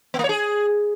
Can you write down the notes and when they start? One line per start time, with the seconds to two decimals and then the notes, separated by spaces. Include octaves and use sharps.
0.14 B3
0.19 A#3
0.24 C#5
0.29 G#4